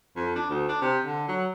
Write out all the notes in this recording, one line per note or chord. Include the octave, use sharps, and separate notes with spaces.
F2
D4
D2
D4
C3
D3
F#3